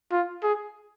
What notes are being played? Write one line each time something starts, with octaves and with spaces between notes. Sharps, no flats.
F4
G#4